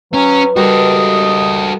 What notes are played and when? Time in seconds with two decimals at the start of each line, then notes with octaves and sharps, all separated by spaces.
0.14 F#3 C#4 B4
0.56 G3 F#4 A4 A#4 D#5